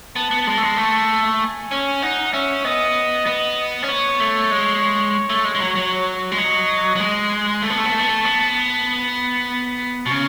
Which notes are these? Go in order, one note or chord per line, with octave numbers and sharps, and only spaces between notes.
B3 A5
B3
G#3 A5
A3
G#3
A3
G#5
C#4
D#4 F#5
C#4 E5
B3 D#5
B3
C#4
B3 C#5
A3
G#3
A3
G#3
G#3
F#3
F#3
G#3
F#3 D#5
F#3
G#3
A3 A5
B3
A3
B3
A3
B3
A3
B3
B5
B2
C#3